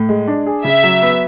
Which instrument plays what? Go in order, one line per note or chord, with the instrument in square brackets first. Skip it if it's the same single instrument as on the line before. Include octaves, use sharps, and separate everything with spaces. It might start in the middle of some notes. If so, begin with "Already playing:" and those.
Already playing: [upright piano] A2
G#3
D4
G#4
[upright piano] C#3 [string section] E5
[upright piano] F#3
B3